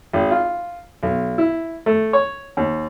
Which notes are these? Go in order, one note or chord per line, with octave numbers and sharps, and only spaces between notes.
G#1
F4
B1
E4
A3
C#5
D#2